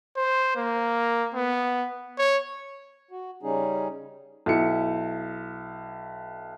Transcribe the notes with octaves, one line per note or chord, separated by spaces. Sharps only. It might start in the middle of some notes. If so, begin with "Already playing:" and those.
C5
A#3
B3
C#5
F#4
C#3 G3 C#4 D#4 G#4
B1 E4 C#7